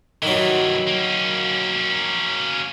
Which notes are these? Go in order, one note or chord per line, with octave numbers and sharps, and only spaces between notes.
G2 D#3 E3 F#3
A#3 C#4